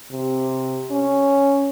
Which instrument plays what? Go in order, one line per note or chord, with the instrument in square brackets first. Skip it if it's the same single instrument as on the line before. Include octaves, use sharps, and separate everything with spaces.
[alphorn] C3
C#4